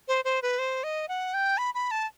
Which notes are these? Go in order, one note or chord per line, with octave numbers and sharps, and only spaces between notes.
C5
C5
B4
C5
D#5
F#5
G5
B5
B5
A5